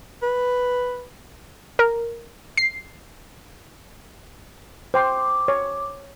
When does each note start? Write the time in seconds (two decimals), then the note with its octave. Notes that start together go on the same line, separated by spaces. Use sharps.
0.22 B4
1.79 A#4
2.57 C7
4.94 C5 G5 C6 D6
5.48 C#5